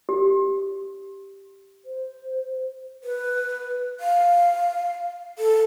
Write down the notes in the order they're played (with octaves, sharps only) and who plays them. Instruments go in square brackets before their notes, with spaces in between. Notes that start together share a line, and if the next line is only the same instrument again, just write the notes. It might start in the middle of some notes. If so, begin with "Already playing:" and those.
[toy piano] G4
[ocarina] C5
[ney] B4
F5
A4